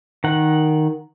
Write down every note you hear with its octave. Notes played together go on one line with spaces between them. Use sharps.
D#3 F#5